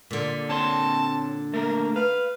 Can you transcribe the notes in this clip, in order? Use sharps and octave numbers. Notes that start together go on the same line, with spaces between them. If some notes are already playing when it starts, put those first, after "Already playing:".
A#2 D3
C4 C#5 A5 C6
A3 A#3 A#4
B4 F5